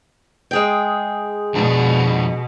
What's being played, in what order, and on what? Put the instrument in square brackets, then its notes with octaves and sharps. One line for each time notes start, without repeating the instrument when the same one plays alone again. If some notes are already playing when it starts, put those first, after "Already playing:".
[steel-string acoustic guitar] G#3 G#4 G5
[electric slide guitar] F2 D4 D5 [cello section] B2